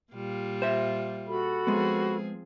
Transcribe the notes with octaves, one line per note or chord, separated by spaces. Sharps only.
A#2 G3 F4
C5 E5
F#4 A4 B5
F3 G#3 B3 C4 G#4